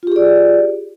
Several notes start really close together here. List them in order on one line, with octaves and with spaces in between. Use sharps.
F4 G4 G#4 D5